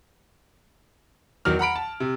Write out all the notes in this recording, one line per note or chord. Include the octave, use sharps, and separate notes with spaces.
E2 D#3 F#3 F6
F#5 A#5 B5 D7
A5
C3